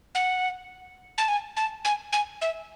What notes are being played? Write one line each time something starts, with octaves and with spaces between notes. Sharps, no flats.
F#5
A5
G#5
A5
G#5
G#5
E5